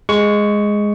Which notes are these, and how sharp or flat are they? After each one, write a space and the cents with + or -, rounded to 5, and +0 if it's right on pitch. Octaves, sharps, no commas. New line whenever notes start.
G#3 +0 C#6 +10